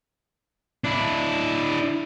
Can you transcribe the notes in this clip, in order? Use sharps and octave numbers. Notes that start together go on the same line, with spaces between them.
D4 E4